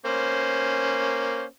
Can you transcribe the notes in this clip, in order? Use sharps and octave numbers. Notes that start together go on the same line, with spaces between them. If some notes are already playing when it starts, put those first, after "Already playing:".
A#3 C#4 C5